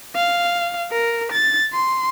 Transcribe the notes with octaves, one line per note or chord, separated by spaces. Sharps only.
F5
A#4
A6
C6